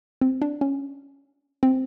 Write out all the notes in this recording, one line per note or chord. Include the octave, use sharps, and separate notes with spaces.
C4
D4
C#4
C4